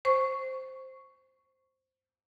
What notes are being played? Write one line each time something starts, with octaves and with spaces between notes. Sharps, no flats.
C5 C#6